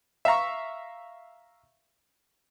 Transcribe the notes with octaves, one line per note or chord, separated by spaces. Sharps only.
E5 F5 A#5 C#6